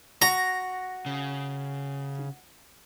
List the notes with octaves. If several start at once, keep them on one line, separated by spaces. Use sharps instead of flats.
F#4 A#5
C#3